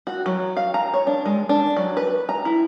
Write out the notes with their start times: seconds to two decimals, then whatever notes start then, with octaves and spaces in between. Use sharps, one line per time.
0.07 F#4
0.26 F#3
0.57 F5
0.74 A#5
0.94 C#5
1.07 D4
1.26 G#3
1.49 D4
1.77 F#3
1.97 B4
2.29 A#5
2.45 E4